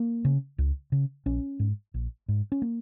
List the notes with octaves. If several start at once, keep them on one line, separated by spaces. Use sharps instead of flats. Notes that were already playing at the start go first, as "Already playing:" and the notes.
Already playing: A#3
C#3
C#2
C#3
A#1 C#4
G#2
A#1
G#2
C#4
A#3